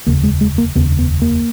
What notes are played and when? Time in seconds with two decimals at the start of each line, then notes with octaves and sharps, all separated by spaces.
0.06 F1 D#2 C#3 A#3
0.23 G#3
0.41 G#3
0.58 A#3
0.75 F1 D#2 C#3 B3
0.99 B3
1.22 A#3